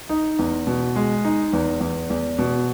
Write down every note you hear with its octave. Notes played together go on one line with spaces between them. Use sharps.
D#4
E2
B2
G#3
D#4
E2
E2
E2
B2